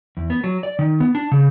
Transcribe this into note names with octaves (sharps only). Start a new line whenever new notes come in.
E2
B3
F#3
D5
D#3
B3
D4
C#3